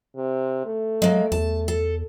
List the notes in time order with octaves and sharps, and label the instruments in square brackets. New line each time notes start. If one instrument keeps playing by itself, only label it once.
[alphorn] C3
A3
[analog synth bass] F#3 [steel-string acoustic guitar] G#3 A#3
[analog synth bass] E2 [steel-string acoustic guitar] A5
[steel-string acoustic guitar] A4